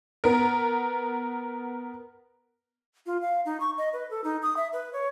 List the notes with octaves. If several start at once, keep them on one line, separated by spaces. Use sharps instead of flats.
B3 A#4
F4
F5
D#4
C#6
D#5
B4
A4
D#4
D#6
E5
B4
C#5